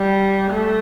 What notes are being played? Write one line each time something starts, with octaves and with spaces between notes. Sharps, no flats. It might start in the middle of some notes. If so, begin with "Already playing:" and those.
Already playing: G3
A3